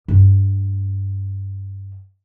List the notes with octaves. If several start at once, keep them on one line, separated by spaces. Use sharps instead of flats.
G2 A3